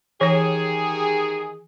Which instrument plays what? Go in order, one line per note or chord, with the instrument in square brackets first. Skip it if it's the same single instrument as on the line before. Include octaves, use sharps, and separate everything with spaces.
[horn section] D#3 G4 G#4 [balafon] E3 C#5